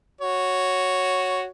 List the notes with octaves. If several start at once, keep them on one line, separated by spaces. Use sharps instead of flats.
F#4 C#5